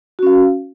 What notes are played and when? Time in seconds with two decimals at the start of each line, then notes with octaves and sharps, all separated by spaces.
0.19 F#4
0.23 C#4
0.27 F5